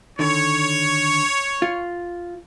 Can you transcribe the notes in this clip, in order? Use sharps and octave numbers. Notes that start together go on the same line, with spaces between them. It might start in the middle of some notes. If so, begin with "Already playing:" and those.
D3 D#3 C#5
F4